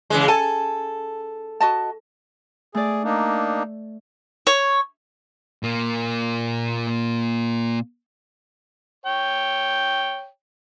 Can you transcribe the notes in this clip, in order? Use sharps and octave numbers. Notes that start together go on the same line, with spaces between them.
C#3 E3 G#3
A4 G#5 A5
F#4 D#5 A5
A3 G#4 D5
A#3 D4 D#4
C#5
A#2 A#3
C#5 G5